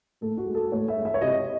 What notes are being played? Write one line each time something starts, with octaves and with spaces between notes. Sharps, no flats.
A2 A4
F#4
G#3
A4
A2 C#5
E5
G#3
E5
C#5
C3 D#5